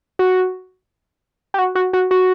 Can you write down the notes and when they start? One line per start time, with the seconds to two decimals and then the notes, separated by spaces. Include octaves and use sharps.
0.19 F#4
1.54 G4
1.58 F#4
1.75 F#4
1.93 F#4
2.11 F#4